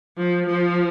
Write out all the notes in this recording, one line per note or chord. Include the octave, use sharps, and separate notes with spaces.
F3
F3